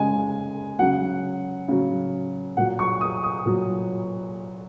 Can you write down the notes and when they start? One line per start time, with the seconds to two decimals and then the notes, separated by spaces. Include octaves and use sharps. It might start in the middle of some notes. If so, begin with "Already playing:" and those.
Already playing: C#3 G#3 G#5
0.79 C#3 F#3 F#5
1.68 C#3 F#3
2.57 A#2 F#3 F#5
2.79 C#6
3.01 D#6
3.23 D#6
3.45 A#2 F#3